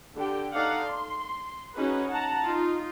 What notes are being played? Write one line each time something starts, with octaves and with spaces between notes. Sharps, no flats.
D3 G4 G5
D#4 A4 D5 F5 F#5
C6
C#4 D#4 F#4 G#4 B4
F#5 A5 A#5
D#4 F4